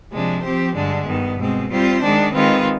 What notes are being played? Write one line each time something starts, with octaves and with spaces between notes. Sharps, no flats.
C3 F3 G#3 D4
F3 C4 G4 C5
G2 D3 G#3 D4
G2 D#3 B3
B2 G#3 C4
G3 C4 F4 C5
D#3 G#3 D4
D#3 G#3 C4 F4 B4